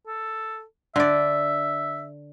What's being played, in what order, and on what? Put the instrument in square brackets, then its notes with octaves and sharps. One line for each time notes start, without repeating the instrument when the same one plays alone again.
[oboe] A4
[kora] D3 D5 [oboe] E5